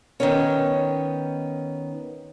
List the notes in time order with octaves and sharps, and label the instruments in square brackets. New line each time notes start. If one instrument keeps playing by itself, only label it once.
[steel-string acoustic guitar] D#3 B3 C#4